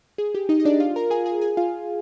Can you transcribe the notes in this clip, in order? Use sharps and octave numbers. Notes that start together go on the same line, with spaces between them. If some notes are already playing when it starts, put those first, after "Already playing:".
G#4
G4
D#4 D#5
D#5
D4 D5
F4 F5
A#4 A#5
G#4 G#5
G#4 G#5
G#4 G#5
F4 F5